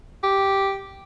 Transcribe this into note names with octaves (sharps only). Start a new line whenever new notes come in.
G4